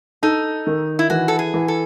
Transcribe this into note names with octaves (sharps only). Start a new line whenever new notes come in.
D#4 A4
D#3
E4
E3 F#4
A4
G#4
E3
A4